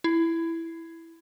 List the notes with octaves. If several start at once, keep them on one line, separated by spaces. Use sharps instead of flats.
E4